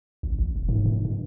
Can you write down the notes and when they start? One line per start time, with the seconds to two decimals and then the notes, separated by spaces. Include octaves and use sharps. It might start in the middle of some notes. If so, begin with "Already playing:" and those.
0.23 G#1
0.39 A1
0.56 E1
0.69 G#2
0.86 G#2
1.05 G2